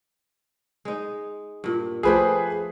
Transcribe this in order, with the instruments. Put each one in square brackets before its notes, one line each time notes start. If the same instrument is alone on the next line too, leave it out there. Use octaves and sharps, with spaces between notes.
[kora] G#3 D#4
G2 A#2
[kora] F3 A3 G4 [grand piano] G#4 B4 C5